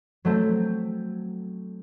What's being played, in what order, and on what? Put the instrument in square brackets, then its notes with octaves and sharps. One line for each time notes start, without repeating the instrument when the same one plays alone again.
[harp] F#3 A3 C4